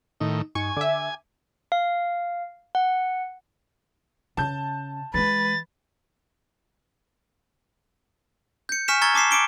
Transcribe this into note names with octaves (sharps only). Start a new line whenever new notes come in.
A2 D#3 D#4
G2 D#4 G#5 C#6
D3 E5 D6
F5
F#5
C#3 A5 G6
E3 G#3 B4 A6
G6 C#7
G#5 C#6 F6 B6 C#7 E7
A#5 C#6 E6 G#6 A6 G7
A5 D6 B6 C7 E7
D6 C#7 D7 G7